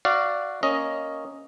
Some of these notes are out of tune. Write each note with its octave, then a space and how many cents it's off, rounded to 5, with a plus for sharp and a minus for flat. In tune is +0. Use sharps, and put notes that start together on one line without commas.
F#4 +0 D5 +0 F5 -20
A#3 +0 C#4 +0 D#5 +5